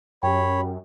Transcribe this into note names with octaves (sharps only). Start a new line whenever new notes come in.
F#2 G4 C#5 G5 B5